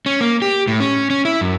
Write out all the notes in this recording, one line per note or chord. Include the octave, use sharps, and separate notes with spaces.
C#4
A#3
G4
A2
C#4
C#4
E4
F#2